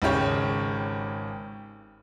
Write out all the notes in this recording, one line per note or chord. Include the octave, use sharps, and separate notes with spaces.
G#1 C#3 G4 C#5